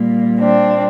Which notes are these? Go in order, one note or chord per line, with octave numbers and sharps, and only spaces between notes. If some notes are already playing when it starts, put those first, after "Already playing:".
Already playing: A#2 G3 A#3
C4 D4